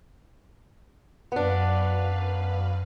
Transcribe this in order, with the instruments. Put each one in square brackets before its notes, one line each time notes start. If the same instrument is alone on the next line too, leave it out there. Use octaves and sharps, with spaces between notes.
[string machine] F#2 B4 F5 [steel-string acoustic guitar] B3 D4